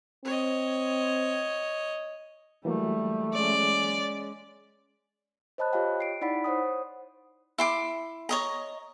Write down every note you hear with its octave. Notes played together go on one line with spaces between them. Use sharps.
C4 C#5 D#5
E3 F#3 G3 A3 A#3
G#3 C#4 D5
C5 C#5 D#5 A5 B5 F#6
F4 G4 C#5 D#5 F5 G5
C7 D7
D#4 E4 D5 F#5 B5 B6
C5 C#5 F#5 D#6
E4 C6 D6
C#5 D#5 A#5